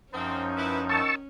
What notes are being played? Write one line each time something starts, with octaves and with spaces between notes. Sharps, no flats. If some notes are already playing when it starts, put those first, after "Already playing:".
F#2 F3 C4 C#4 D#4
E4 B4
D#3 A5 C#6 E6